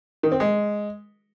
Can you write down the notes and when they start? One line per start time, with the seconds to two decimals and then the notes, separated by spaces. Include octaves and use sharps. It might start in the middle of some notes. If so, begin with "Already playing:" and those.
0.23 D#3
0.32 C4
0.40 G#3